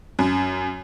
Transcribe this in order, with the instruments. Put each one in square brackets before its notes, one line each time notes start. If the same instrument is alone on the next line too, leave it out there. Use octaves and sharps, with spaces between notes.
[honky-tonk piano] F#2